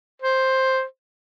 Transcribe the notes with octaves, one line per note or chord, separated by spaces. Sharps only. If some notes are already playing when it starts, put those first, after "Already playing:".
C5